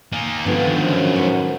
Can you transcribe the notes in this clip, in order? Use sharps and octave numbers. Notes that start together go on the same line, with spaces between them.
A#3 D#4 G#5
G#2 D3 D#3 F3 B3 D4 F4
F#2 C5
B4 C#5